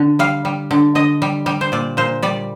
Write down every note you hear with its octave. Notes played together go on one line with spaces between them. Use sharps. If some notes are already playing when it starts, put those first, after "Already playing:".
Already playing: D3
G3 F5
G3
D3
D3 D#5
G3
G3
C5
A#2 D5
A#2 C5
G3 D5